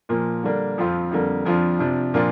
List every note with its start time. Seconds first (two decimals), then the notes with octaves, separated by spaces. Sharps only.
0.09 A#2 F3 A#3
0.43 D3 G3 A#3 D4
0.78 F2 F3 C4 F4
1.11 F2 D3 G3 A#3
1.45 F2 F3 D4 F4
1.79 C3 F3 D4
2.14 A#2 F3 A#3 D4 F4